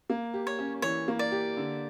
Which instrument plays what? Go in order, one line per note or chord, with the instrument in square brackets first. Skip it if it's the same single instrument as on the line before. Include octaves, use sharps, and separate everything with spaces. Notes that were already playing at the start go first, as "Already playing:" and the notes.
[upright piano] A#3
G4
[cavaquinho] C#5
[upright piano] C#4
[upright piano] E3 [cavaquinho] C#5
[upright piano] A#3
[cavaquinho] D5
[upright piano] G4
D3